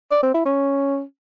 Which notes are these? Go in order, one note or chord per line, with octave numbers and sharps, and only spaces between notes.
D5
C4
E4
C#4